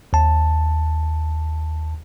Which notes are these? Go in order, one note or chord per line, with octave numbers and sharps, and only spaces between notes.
D#2 A5